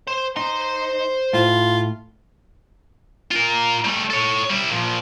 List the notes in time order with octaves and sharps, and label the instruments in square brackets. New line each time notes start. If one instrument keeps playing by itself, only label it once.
[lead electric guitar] C5
[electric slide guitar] D#4 [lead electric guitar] C5 C6
[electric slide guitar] A2 [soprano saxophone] F4
[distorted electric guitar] F4 A#4
G3 A3
A4 C#5
G3 E4
A#2 F3